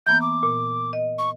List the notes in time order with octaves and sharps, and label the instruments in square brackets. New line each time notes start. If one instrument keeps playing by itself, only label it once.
[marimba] E3 A#3 B3 [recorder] G6
[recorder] D6
[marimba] A#2
D#5
[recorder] C#6